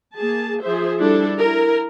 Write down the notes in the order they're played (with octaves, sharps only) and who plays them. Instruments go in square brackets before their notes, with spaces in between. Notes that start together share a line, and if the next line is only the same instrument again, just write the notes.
[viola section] A#3 G#4 A5
F3 G#4 C5 E5
G3 D4 E4 A4
E4 A#4